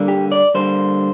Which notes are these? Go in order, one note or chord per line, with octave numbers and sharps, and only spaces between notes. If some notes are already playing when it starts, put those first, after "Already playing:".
Already playing: D3 G3 A#3
G4
D5
D3 G3 A#3 C5